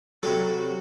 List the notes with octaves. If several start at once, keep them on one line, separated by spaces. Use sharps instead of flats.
C3 F#3 G3 F#4 A4